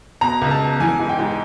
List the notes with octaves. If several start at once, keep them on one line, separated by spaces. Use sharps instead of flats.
B2 A#5
C#2
A5
B2
E3 G#5
G#2
G5
G#2